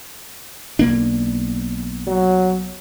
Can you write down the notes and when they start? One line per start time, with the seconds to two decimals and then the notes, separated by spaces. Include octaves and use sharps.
0.79 B1 A#3 D4
2.07 F#3